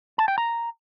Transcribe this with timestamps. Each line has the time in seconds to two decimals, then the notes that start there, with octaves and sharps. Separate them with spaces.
0.18 A5
0.28 G5
0.38 A#5